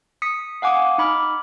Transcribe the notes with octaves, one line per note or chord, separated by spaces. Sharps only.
D#6 B6 C#7
F5 F#5 G#5 D6 D#6
D#4 B5 D6 F6